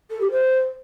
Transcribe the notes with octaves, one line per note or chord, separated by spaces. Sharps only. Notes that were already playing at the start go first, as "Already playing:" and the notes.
A4
G4
C5